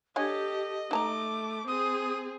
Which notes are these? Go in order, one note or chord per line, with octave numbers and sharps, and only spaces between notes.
D4 G4 A4 C#5 D#5 G#5
A3 D#4 A5 A#5 D6
C4 G#4 D#6